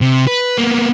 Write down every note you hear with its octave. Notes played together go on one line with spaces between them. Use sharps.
C3
B4
A#3 B3